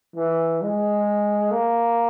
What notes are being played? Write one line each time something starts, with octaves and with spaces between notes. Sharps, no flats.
E3
G#3
A#3